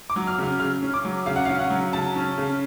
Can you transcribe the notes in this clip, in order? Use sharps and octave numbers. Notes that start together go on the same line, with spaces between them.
D6
F#3
F6
C#3 F6
C#3 F6
C#4
D6
F#3
C#3 F5
F#5
C#4 F5
F#5
F#3
C#3 A5
C#4
C#3